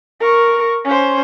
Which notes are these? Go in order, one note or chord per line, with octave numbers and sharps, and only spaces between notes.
A#4 C#6
C#4 C5